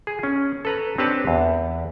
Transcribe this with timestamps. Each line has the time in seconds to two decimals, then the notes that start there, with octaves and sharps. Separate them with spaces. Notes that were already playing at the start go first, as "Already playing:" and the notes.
0.07 G#4
0.23 C#4
0.65 A4 B4 A#5
0.98 C4 D4 G4 B4 C#5 A5
1.27 E2